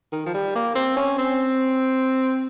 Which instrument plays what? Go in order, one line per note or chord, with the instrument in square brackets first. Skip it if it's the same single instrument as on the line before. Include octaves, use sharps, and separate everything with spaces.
[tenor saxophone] D#3
F3
G3
A#3
C4
C#4
C4